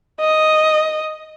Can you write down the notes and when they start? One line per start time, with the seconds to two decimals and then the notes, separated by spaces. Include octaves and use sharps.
0.20 D#5